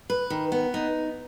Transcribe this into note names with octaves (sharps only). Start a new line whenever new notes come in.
B4
D#3
B3
D#4